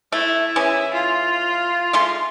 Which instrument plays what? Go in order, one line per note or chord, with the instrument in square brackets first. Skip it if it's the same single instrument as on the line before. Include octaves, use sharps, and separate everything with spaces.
[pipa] A3 [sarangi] E4
[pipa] E3 C#4 G#4
[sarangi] F4
[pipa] G#3 A3 C6